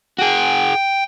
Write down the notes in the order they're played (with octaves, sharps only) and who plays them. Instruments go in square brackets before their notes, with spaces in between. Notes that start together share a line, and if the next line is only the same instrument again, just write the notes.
[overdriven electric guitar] F#4 G#4 [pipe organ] G5